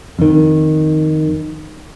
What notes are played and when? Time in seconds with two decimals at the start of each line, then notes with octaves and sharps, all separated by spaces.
0.19 F2 D#3